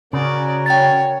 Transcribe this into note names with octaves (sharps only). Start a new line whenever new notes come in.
C#3 C#4 F#4 A#4 D5
C#5 G5 A6